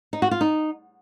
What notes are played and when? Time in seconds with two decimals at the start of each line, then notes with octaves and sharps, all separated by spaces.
0.13 D#4
0.22 F#4
0.31 F4
0.41 D#4